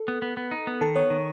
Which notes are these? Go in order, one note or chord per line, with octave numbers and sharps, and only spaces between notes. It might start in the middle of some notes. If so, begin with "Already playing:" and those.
Already playing: A4
B3
B3
B3
D#4
B3
D#3 A4 A5
B3 C#5 C#6
D#3